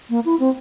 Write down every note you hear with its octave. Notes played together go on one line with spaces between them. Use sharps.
A#3
E4
C4